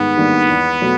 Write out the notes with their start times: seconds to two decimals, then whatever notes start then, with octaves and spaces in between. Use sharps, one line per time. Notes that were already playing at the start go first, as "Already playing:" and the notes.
Already playing: G#2 D#3 G3 B3
0.17 D#3 G3 A#3 D4
0.49 E2
0.82 B2 F#3 A3